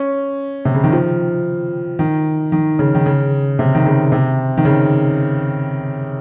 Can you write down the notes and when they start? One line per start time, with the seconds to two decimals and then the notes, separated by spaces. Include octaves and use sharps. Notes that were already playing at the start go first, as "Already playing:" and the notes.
Already playing: C#4
0.65 C3
0.74 C#3
0.84 D#3
0.93 F3
1.99 D#3
2.52 D#3
2.79 C#3
2.95 D#3
3.06 C#3
3.59 C3
3.75 D#3
3.86 C#3
4.12 C3
4.58 D#3
4.65 C#3